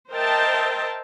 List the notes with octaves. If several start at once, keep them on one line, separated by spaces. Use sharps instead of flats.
A#4 C5 D#5 E5 G5 A5